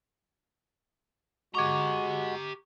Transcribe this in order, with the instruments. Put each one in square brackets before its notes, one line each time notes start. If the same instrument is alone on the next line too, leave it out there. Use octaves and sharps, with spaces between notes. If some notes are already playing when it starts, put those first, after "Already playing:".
[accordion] G#3 F#4 [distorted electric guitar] G4 A#5 [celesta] C#6 D6 G#6